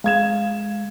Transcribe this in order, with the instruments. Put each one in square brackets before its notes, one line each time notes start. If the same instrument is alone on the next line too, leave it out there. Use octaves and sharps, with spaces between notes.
[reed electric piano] G#3 [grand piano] F5 G#6 E7